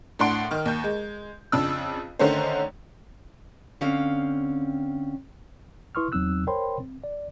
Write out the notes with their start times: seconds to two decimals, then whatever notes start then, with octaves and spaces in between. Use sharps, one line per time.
0.19 A2 D4 F#5 C6 D7
0.51 D#3 F6
0.66 D#2 G6
0.84 G#3
1.52 F2 C#3 D4 E6
2.19 D3 D#3 A3 C#4 D#4 C5
3.81 D3 C4 C#4 F5
5.95 E4 B4 C6 C#6 D#6 F6
6.12 E2 F#3 C4 D#4 E6 F#6
6.47 A#4 C5 C#5 G5 B5 C6
6.80 C4
7.04 D5